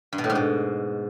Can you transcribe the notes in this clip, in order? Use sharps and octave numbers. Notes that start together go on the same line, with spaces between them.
G2
B2
A2
G#2
B2